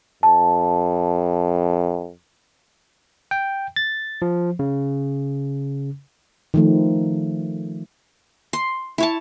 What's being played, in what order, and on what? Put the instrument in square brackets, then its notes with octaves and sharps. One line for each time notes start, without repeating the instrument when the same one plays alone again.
[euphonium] F2 [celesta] A5
[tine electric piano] G5
A6
F3
C#3
[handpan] D#3 F3 A3
[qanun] C6
E4 C#5 A5